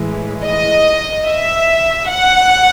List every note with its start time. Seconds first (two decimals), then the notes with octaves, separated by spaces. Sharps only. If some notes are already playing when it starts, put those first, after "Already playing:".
Already playing: A2 E3 G#3
0.44 D#5
1.26 E5
2.08 F#5